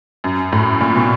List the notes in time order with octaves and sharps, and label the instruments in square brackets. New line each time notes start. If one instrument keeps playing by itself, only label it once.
[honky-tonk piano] F#2
A2
A#2
B2